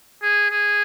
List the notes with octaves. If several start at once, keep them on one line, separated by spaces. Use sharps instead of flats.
G#4
G#4